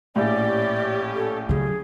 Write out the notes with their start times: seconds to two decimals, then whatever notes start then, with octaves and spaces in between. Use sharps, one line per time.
0.16 A#1 A2 C#4 G4 D5
1.15 A4
1.49 C#3 F#3 G#4